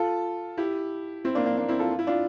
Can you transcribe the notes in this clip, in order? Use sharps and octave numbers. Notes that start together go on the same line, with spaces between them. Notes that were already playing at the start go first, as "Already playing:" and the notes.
Already playing: F4 A4
E4 G4
C4 E4
A#3 D4
A#3 D4
A#3 D4
C4 E4
F4 A4
F4
E4
D4 F4